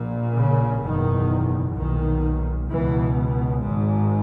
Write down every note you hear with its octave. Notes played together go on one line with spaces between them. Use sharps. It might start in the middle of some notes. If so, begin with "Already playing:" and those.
Already playing: A#1 A#2
C#3
F#1 E2 B2 D#3
B1 A#2 D#3
C#2 B2 E3
G#1 G#2